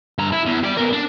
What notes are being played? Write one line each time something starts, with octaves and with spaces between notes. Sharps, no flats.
G2 A#5
E4
E2
G4 D5
B2 A#4
D4